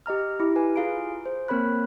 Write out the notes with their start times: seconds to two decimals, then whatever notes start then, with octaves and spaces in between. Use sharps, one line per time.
0.06 G4 D#5 A#5 F6
0.40 E4 G4 D6
0.56 B4 G#5
0.76 F4 G#4 F5 A#5 D7
1.26 C5
1.48 A#3 C4 A#4 C#5 B5 F#6